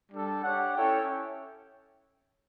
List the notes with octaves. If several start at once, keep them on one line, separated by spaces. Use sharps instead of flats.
G3 D4 A4
D4 G4 C#5 F#5
C#4 E4 A4 C#5 G5